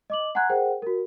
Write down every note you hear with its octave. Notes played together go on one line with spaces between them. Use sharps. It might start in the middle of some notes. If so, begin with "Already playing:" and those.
D#5 D6 F#7
F#5 G#5 A#5 C6 F#6 G#6
G#4 A#4 C5 F#5 G5
F#4 A#4